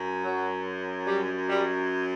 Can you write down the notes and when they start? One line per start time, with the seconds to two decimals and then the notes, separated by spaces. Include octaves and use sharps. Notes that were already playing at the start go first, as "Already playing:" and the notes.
Already playing: F#2
0.24 F#3
1.07 G3
1.49 G3